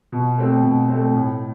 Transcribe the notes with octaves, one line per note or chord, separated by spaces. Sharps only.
B2
A3 C4
B2
C4
A3
A2